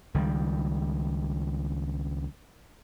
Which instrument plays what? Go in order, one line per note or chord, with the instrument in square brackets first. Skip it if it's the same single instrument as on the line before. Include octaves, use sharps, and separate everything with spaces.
[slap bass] C#2 D#3 F#3 G3